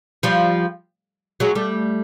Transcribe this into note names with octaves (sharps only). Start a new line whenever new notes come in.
F3 G3
F#3 G#3
G3 A3